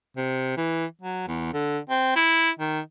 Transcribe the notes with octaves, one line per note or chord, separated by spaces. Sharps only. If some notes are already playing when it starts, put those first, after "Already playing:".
C3
E3
F#3
E2
D3
C4
E4
D#3